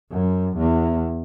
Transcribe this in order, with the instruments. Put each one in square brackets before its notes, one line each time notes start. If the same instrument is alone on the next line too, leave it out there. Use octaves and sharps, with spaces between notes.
[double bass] F#2
E2